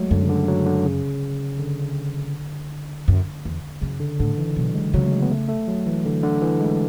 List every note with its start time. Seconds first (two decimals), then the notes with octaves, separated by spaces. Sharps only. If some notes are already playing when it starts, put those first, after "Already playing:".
Already playing: F#3 G#3 A3
0.11 F#2 D3
0.23 C#3
0.29 D3
0.48 F#3
0.66 D3
0.85 C#3
1.59 D3
3.08 F#2
3.45 E2
3.81 F#2 C#3
4.00 D3
4.19 A2 D3
4.38 E3
4.56 B2 F#3
4.75 G#3
4.94 C#3 F#3
5.05 A3
5.11 G#3
5.22 B3
5.31 A3
5.48 A3
5.67 F#3
5.86 E3
6.05 D3
6.23 D3
6.42 E3
6.60 G#3